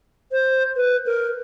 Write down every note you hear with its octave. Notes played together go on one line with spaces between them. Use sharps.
C5
B4
A#4